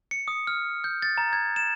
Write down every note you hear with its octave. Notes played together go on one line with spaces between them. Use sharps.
C#7
D#6
F6
G6
A6
A#5
G#6
E7